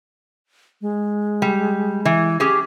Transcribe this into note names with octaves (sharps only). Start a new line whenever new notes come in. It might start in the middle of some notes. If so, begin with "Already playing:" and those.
G#3
G3
E3
C#4 G4 G#4